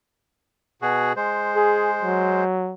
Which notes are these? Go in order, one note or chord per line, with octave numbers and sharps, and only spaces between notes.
B2 F#4 G#4
G#3 C5
G#4
F#3